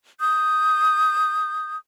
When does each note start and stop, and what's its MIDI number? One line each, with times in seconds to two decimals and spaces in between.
0.19 1.75 87
0.19 1.75 91